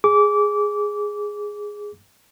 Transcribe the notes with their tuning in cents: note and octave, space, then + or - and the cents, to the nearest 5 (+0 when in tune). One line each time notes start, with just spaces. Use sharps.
G#4 +0 D6 -20